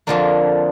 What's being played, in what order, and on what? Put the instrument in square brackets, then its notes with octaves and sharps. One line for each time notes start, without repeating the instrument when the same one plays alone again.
[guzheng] F2 D3 F3 A#3 D4